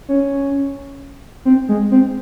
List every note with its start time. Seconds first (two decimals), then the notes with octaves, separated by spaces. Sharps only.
0.08 C#4
1.45 C4
1.68 G#3
1.91 C4